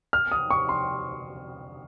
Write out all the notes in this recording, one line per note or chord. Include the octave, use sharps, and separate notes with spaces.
F6
D#6
C#6
C6